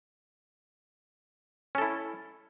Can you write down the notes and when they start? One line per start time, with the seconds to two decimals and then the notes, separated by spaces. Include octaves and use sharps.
1.75 C#4
1.78 A4
1.82 E4